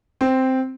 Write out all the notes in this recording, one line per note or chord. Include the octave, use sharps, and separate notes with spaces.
C4